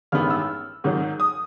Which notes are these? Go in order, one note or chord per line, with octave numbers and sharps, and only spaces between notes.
A1 G2 D#3 G#3 B3 F6
E6
G#2 D#3 F#3
D#6